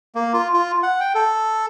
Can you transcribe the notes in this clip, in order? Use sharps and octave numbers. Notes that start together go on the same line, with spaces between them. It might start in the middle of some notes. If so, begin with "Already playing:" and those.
A#3
F4
F4
F#5
G5
A4